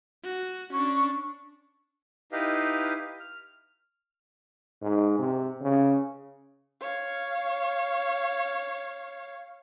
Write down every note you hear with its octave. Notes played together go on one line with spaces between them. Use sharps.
F#4
C#4 D4 C#6
D#4 E4 G4 B4 D#5 F5
F6
G#2
C3
C#3
C#5 F5